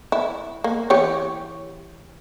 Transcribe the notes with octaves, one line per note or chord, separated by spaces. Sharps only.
E4
A#3
E3 G4 C#5